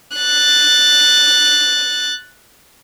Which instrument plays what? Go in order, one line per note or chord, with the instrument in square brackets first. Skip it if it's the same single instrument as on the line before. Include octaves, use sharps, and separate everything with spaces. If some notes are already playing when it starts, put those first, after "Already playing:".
[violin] F#6 A6